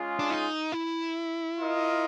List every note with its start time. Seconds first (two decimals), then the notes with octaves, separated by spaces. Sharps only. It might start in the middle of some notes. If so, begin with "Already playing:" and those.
Already playing: G#3 C#4 F4 G#4
0.19 D4
0.30 D#4
0.72 E4
1.59 F4 A#4 D#5